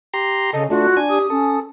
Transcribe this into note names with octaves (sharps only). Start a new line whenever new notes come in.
G4 A#5 C6
C#3 A4 D#5
A3 D4 F4 F#4
D4 G#5
G4 D#6
C#4 A4